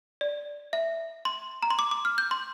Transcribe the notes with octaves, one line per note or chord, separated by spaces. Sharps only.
D5
E5
C6
A#5
C6
D6
D6
F6
G6
C6